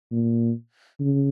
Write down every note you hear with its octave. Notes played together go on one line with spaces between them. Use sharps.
A#2
C#3